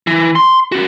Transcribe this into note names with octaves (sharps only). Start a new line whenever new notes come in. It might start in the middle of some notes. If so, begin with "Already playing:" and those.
E3
C6
C#4 F#4